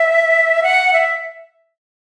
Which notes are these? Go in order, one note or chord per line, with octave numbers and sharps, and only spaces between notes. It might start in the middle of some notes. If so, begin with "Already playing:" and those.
Already playing: E5
F#5
E5